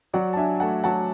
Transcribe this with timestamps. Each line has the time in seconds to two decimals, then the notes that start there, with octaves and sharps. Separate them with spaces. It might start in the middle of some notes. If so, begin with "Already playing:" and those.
0.13 F#3 D5 F#5
0.33 A5
0.37 D4 E5 G#5
0.60 A3 F#5 A5
0.84 F#3 F#5 A5